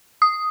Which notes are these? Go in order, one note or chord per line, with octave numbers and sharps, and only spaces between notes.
D#6